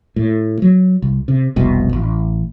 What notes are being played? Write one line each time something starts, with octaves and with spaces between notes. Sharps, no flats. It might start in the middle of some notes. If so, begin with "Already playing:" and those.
A2
F#3
C2
C3
F1 C2 B2
A1